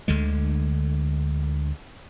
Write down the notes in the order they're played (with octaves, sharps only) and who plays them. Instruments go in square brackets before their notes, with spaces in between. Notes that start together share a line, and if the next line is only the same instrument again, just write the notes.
[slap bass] D2 D3 G#3